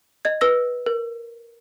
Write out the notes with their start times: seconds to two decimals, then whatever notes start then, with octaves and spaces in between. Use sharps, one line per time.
0.25 D#5 G#6
0.41 B4 E6 A#6
0.86 A#4